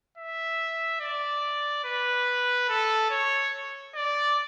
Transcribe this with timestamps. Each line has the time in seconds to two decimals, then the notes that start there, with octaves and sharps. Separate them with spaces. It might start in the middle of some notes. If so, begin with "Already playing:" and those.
0.18 E5
1.00 D5
1.85 B4
2.69 A4
3.10 C#5
3.95 D5